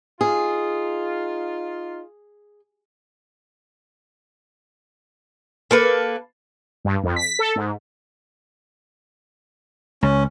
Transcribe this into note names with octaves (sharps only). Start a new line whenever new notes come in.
D#4 F4 G#4
A#3 A4 B4
G2
F2
B6
A4
G#2
C#2 C#4